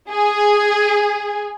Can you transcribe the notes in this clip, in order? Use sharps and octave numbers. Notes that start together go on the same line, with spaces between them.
G#4